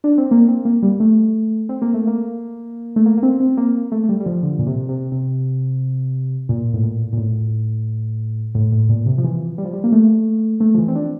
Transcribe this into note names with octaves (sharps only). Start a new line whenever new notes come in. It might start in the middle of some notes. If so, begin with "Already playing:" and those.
D4
C4
A#3
C4
A#3
G3
A3
C4
A#3
A3
A#3
A3
A#3
A#3
C4
C4
A#3
A3
A3
G3
G3
F3
D3
A#2
C3
C3
C3
A#2
A2
A#2
A#2
A2
A2
A2
A#2
C3
F3
E3
G3
F3
G3
A#3
A3
A3
F3
E3
C4
D4